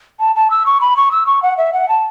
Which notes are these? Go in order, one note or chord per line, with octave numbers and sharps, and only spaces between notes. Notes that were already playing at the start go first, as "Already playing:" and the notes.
A5
A5
E6
C#6
B5
C#6
E6
C#6
F#5
E5
F#5
A5